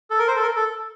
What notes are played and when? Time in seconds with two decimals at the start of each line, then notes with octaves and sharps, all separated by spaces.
0.10 A4
0.19 A#4
0.28 C5
0.36 A4
0.42 A#4
0.56 A4